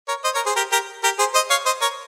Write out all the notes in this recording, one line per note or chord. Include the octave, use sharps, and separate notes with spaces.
A#4 C#5
C5 D#5
A#4 C#5
G#4 C5
G4 A#4
G4 A#4
G4 A#4
G#4 C5
C5 D#5
C#5 F5
C5 D#5
A#4 C#5